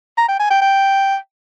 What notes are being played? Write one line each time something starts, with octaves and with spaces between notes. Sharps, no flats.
A#5
G5
G#5
G5
G5